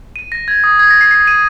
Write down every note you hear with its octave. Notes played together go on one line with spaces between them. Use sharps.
D#7
A#6
G#6
D#6
G#6
A#6
C7
C7
D#7